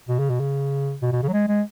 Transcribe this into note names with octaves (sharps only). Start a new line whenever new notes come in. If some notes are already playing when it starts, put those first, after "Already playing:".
B2
C#3
B2
C#3
B2
B2
C#3
F#3
G#3
G#3